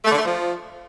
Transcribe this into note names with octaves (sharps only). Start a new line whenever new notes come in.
A3
D3
A3
F3